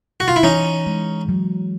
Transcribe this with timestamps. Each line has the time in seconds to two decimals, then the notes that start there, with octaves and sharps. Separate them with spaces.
0.20 F#4
0.28 F4
0.36 E4
0.43 E3 C#4 D#4
0.86 G#3
1.29 F#3